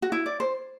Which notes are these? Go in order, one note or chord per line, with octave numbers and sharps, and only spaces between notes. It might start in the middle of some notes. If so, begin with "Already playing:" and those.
F#4
E4
D5
C5